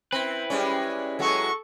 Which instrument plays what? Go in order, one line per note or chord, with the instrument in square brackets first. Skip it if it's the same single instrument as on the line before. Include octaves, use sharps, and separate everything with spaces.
[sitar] C4 [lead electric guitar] E4 B4
[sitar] G3 G#3 C#4
[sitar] F#3 G#3 F#4 [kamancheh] A4 C#6